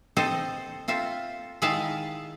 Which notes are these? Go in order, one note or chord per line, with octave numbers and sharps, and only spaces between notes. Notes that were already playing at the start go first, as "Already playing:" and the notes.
C4 A4 C5 D#5
C4 F4 A4 E5
D#3 G#3 E4 E5 F5 A5